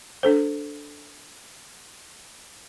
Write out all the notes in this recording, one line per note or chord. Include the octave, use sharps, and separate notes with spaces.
D4 A4 C5